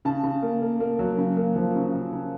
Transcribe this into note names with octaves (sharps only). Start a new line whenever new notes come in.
C#3 A5
C#3
A#3
A#3
A#3
F#3
C#3
A#3
F3
C#3
C#3
C#3